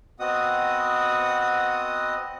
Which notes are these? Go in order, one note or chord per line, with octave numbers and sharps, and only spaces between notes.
B3 C4 F#4 D#5 F#5 D#6